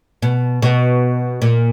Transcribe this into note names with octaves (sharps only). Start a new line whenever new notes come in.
B2
B2
A#2